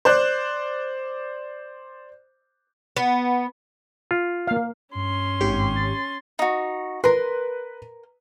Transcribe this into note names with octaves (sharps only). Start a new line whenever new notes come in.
C5 D5 F#6
B3
F4
A#3 F5
G2 C#4 C6
G#1 G4 C#5
A6
D#4 F#4
A#4 B4 C6